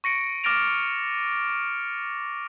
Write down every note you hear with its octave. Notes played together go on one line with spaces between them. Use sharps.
C#6 A#6 C#7 D7
D6 F6 A6 A#6 D7 F7